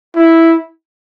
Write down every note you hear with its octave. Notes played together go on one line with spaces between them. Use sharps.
E4